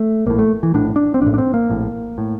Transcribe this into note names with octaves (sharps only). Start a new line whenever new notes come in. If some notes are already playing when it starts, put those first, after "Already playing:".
Already playing: A3
A#1 A2 A#3
A3
E3
A#1 A2 D4
D4
C4
A#1 D4
A2
D4
C4
A#3
A#1 A2
A2